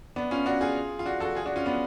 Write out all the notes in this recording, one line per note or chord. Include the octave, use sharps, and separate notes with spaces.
B3 D4
C#4 F4
D4 F#4
F4 G#4
F4
D4 F#4
F#4 A4
F4 G#4
D4 F#4
C#4 F4
B3 D4